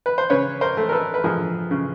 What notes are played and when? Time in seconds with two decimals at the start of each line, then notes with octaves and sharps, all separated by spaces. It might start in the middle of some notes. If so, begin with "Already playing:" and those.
0.06 B4
0.18 C5
0.30 C#3 B4 C#5
0.61 A#4 C5
0.77 A3
0.89 A#4
0.92 A4 B4
1.14 B4
1.24 F3 G#4 A#4
1.71 C#3